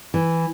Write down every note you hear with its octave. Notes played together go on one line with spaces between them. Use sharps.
E3